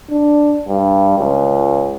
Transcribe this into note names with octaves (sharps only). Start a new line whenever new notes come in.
D4
G2
C#2